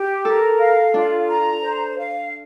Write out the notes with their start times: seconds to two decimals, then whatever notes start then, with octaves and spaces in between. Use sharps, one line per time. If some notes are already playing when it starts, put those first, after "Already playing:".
Already playing: G4
0.25 A4 A#4
0.59 F5
0.94 D4 F4
1.29 A#5
1.63 C5
1.98 F5